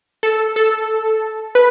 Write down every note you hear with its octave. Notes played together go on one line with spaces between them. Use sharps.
A4
A4
B4